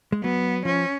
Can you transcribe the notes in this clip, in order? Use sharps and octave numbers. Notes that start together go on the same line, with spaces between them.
G#3
F#3 B3
F3 C#4